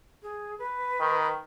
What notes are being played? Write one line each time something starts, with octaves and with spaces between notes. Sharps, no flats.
G#4
B4
D#3